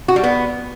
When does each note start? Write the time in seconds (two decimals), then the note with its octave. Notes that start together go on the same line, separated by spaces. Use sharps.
0.08 F#4
0.16 G3
0.24 B3